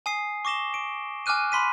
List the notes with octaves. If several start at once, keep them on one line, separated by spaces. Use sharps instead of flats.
G#5 D#6 C7
C#6 D6 A#6 E7 G7
D7
G#5 D6 F6 F#6 D#7
B5 C6 B6 D#7